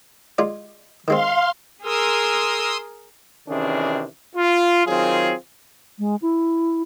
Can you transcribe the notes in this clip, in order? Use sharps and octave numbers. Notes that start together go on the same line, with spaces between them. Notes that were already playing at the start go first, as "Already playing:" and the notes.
G#3 F4 D5
D#3 G#3 C4 F5 C6
G#4 A#4 C6 D#6 E6
C3 D#3 E3 C#4 D4 G#4
F4
D#3 F#3 C4 F4 G#4
G#3
E4